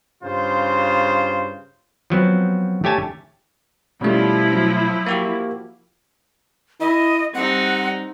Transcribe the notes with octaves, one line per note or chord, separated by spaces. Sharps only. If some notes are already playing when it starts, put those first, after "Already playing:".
G2 C#3 F4 C5
F3 F#3 B3 C4
A3 G4 C#5 G#5 A5
B2 F3 G3 A3 C#4 E4
F#3
A#3 F#4 G4
E4 D#5
G3 C4 D#4 F#5